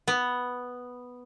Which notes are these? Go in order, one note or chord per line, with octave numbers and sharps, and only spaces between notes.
B3